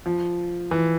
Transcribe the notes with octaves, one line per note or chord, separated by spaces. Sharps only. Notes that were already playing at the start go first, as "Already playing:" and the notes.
F3
E3